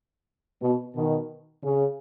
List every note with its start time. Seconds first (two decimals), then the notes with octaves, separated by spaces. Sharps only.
0.62 B2
0.95 B2 D#3
1.63 C#3